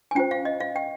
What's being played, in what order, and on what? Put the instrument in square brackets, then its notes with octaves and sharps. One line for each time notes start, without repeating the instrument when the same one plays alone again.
[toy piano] G#5
C#4 F4 C5 G5
F5
D#5
F5
G5